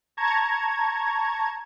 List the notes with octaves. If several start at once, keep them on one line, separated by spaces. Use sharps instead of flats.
A5 A#5 C#6 G#6